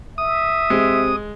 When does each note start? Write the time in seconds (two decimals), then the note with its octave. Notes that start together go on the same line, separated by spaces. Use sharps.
0.18 E5 D#6
0.70 C3 G#3